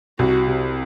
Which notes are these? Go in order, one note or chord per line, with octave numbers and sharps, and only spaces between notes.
C2 F#4
C3